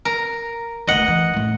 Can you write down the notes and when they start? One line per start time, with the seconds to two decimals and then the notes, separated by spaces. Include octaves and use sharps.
0.05 A#4
0.87 F#1 D2 D#5 F#5
1.08 E3
1.34 F#2 A2